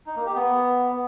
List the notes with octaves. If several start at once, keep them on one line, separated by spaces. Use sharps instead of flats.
D#4
A#3
G4
B3